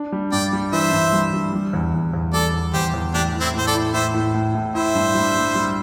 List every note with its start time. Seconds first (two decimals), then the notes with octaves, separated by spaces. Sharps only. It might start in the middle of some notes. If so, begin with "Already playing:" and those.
Already playing: D4
0.12 G3
0.32 G2 D5 G5
0.53 G3
0.72 E3 C5 E5
0.93 G2
1.13 G3
1.33 G3
1.53 G3
1.73 E2
1.93 E2
2.13 E2
2.33 G3 A4 D5
2.54 E2
2.73 E2 G4 C5
2.94 E2
3.14 A2 D4 G4
3.34 A2
3.40 C4 E4
3.54 A2 C5
3.67 A4 D5
3.74 E4
3.94 A2 C5 E5
4.14 A2
4.34 A2
4.55 A2
4.75 E4 C5 E5
4.95 G2
5.15 G3
5.35 G3
5.55 G3